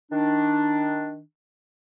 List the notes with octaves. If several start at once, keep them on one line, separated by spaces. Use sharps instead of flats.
D#3 D4